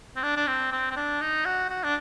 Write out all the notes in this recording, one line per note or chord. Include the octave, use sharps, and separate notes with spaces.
C4
D4
D4
C4
C4
C4
D4
D#4
F#4
F#4
D4